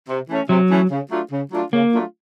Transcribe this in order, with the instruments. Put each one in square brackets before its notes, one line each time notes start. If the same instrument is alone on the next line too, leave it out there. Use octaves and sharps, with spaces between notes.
[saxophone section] C3
E3 A3 C#4
[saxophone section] C3 [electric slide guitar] F#3
[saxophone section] E3 A3 C#4
C#3
F#3 A3 D4 F4
C#3
F#3 A3 D4 F4
[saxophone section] C#3 [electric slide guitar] A#3
[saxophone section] F#3 A3 D4 F4